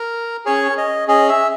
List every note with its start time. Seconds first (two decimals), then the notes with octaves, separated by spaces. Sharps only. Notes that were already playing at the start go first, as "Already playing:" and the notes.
Already playing: A#4
0.45 C#4 G#4 C#5
0.78 D#5
1.08 C#4 G#4 D#5
1.29 E5